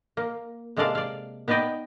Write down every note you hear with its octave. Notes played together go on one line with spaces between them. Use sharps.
A#3
C3 G#3 A#3 A4 D5 F5
D5 F5
B3 D#4 B4 D5 D#5 G5